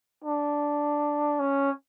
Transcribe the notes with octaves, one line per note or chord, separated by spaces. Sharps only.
D4
C#4